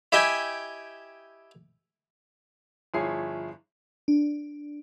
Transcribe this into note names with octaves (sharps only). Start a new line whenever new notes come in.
E4 G4 D#5 E5 G5 G#5
G1 F3 E4 G#4 C#5 C7
D4